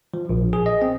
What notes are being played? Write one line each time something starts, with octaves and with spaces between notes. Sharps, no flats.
F3
A#1
G#4
D#5
C4